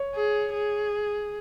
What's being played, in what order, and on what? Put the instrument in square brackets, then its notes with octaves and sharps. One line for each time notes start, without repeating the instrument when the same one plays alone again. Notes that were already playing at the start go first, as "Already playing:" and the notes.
Already playing: [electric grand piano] C#5
[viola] G#4
G#4